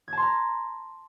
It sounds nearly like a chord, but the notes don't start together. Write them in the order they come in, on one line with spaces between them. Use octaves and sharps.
G#6 A5 C6 A#5